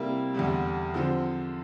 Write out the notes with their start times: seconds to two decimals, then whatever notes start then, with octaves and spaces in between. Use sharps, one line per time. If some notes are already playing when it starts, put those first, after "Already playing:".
Already playing: C3 G3 A#3 E4
0.34 E2 D3 G3
0.94 D3 F3 C4